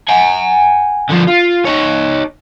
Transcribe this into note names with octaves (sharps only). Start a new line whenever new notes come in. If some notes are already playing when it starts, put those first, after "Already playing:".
F#5 G#5
D3 F3
F4
D#4 C#5